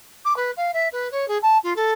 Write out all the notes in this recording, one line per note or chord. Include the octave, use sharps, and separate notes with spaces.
D6
B4
F5
E5
B4
C#5
G#4
A5
F4
A4